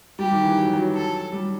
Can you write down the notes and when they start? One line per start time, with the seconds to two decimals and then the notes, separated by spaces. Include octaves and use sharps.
0.19 G3 G4
0.31 D#3
0.44 E3
0.57 F#3
0.66 E3
0.73 F#3
0.95 A4
1.32 G3